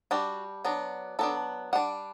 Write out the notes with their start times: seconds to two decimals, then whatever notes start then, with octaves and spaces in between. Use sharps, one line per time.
0.11 G3 D4 F#4
0.65 F#3 B3 D4
1.19 F#3 B3 D4 A4
1.73 G3 D4 F#5